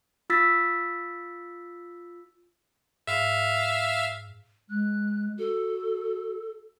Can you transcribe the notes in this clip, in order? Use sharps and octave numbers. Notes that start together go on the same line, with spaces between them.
F4 E6 A6 B6
G#2 E5 F5
G#3 F#6
F#4 A4